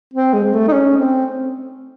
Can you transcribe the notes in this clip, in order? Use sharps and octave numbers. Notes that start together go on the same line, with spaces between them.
C4
G#3
G#3
A3
D#4
C#4
C4